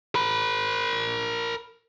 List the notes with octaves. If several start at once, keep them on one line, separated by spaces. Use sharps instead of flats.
A#4 B5